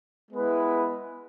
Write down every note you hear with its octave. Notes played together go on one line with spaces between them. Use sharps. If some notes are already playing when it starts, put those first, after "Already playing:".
G#3 B3 E4 B4